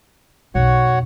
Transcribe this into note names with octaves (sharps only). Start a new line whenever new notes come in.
B1 F2 F#4 C#5 F#5